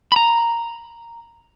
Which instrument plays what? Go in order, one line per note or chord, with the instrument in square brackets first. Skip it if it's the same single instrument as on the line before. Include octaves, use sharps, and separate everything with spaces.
[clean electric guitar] A#5 B5